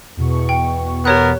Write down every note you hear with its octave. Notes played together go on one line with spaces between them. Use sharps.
E2 B2 C#6
G5
B3 G4 A#4 C#5 F#6